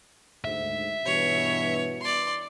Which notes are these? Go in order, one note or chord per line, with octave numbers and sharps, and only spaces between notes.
D2 G#2 E5
G2 B2 E3 C#5
D5 C6